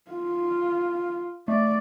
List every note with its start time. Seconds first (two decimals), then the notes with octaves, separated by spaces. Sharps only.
0.11 F4
1.48 A3 D5